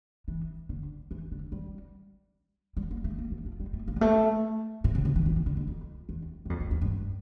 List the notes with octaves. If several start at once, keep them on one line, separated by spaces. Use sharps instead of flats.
E3
D3
E3
D3
G3
G3
A#3
A3
A#3
A3
F3
G3
A3
A#3
G3
A3
A#2
C#3
D3
E3
F3
E3
D3
F2
F2
E2
G2
F2
F2
F2
G2